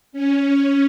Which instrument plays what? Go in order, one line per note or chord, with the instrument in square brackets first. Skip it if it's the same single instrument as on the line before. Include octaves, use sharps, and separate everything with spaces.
[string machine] C#4